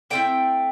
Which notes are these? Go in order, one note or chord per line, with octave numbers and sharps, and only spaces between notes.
D3 A3 C4 E4 G5